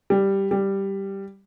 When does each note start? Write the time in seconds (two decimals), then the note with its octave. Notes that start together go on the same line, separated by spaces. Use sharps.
0.10 G3
0.51 G3